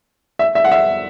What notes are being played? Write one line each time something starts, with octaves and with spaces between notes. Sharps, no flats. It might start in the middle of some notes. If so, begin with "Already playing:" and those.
E5
E5
F#5
E5